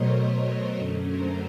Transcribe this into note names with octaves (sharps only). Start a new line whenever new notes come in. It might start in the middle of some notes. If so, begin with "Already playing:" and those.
Already playing: B2 F#3 A3 A#4 C5 C#5 D#5
A#4 C5
F#2 D3 F#3 A3 C#4
A#4 C5